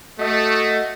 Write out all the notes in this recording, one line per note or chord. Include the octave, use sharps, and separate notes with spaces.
A3 F#4 D#5